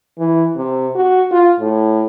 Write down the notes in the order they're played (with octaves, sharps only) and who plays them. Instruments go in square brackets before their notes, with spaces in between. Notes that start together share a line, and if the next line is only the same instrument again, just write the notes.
[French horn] E3
C3
F#4
F4
A2